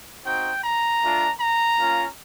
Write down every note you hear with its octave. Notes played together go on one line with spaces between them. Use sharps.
C4 D#4 F#4 G5
A#5
A3 D4 F4
A#5
A#3 C#4 F4